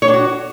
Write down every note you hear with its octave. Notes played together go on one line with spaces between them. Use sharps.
C#5
D4
F#4